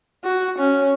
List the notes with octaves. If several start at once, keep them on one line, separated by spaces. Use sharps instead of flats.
F#4
C#4